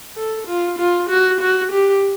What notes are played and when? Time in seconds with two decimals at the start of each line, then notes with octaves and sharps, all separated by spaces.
0.17 A4
0.47 F4
0.79 F4
1.09 F#4
1.40 F#4
1.71 G4